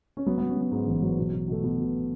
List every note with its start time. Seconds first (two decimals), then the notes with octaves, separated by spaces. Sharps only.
0.17 C#4
0.26 F#3 B3
0.38 B3
0.42 F#3
0.49 C#4
0.57 F#3 B3
0.72 G#2
0.87 A1
1.02 F#3
1.18 B2
1.33 B2
1.48 B2 A3
1.63 B2 B3
1.78 B2